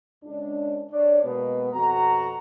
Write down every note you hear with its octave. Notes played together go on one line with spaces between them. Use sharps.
C#2 D4
D4 C#5 D5
B2 G#3 A#3 B3
F2 B2 F#4 F#5 A#5